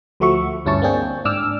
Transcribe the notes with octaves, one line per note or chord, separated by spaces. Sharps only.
D2 F3 A3 F#4 E5 C#6
D2 G2 C#4 E4 A5 C#6
A#3 C4 D4 G#4 G5
G#2 D4 D6 E6 F6